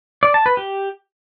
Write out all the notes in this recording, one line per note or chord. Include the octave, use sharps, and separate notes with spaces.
D5
A5
B4
G4